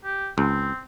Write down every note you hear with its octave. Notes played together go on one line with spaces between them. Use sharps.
G4
C#2 C4